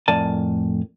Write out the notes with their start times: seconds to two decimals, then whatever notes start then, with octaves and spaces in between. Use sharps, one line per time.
0.08 F2 A2 A#4 D5 G#5 A5